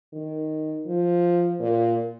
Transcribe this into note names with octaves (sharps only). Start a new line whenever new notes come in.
D#3
F3
A#2